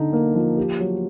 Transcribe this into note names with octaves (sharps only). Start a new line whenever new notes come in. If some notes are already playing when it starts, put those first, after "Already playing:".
Already playing: D3 D#4
A#3
F3
G4
F#3